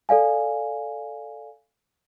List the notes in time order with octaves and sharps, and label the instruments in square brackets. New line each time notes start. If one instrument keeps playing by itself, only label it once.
[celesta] A4 D5 F5 G#5